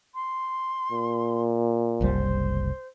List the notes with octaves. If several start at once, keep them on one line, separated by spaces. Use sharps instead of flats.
C6
A#2
F#1 C2 G3 C5